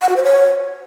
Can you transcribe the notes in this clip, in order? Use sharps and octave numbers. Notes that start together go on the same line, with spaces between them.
F#5
F#4
C5
C#5